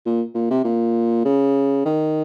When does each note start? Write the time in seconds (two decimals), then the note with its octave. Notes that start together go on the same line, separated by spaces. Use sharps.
0.06 A#2
0.34 A#2
0.50 C3
0.64 A#2
1.25 C#3
1.85 D#3